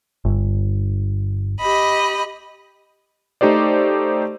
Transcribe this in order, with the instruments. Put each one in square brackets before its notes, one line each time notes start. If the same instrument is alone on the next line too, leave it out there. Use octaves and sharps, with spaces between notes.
[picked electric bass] G1
[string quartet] G4 D#5 B5
[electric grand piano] A3 D#4 G4 C5 D5